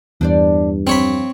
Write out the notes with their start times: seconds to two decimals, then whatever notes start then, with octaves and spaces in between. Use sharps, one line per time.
0.21 E2 G2 D4 C5 D5
0.87 F3 C4 C#5 B5